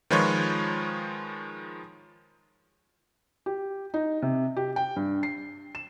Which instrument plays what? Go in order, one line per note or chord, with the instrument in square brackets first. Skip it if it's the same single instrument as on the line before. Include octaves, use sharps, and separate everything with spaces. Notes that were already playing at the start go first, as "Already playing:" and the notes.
[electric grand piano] D#3 F3 G#3 F4 B4 C#5
[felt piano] G4
D#4
C3
G4
G5
G2
C7
E7